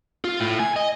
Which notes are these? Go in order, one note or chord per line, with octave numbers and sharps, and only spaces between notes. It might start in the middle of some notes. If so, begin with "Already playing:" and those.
F4
A2
G#5
D#5